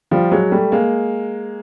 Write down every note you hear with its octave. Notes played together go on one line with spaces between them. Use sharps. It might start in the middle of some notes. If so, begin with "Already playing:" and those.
F3 G3
F#3 G#3
G3 A3
G#3 A#3